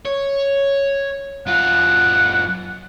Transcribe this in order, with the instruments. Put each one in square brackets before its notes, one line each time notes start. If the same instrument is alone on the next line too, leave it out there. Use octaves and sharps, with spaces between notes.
[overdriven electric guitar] C#5
[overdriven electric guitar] F#2 F4 [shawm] F#5